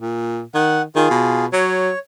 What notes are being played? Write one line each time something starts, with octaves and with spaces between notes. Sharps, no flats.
A#2
D#3 F#5
D#3 F4 G#4
B2
F#3 C#5